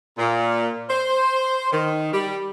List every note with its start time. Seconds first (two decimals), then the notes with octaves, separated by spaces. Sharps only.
0.19 A#2
0.90 C5
1.72 D#3
2.13 G3